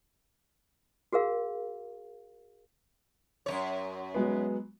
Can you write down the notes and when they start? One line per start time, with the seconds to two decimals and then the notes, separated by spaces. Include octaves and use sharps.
1.13 F#4 G#4 A#4 F5
3.46 F#2 D#3 C#5
4.14 F#3 G#3 B3